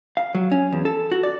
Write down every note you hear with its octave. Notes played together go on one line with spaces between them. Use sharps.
F5
F#3
C#4
E2
A4
F#4
D5